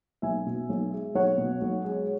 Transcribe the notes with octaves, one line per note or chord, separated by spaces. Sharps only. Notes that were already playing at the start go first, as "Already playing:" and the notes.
B1 E5 G#5
B2
B1
G#3
B1 C#5 F#5
B2
B1
G#3